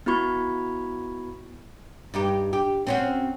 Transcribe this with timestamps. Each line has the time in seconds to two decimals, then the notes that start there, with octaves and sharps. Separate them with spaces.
0.06 B3 E4 F#4 B5 C#6 G#6
2.14 G2 D#4 G4
2.53 G4
2.87 C4 C#4 F#4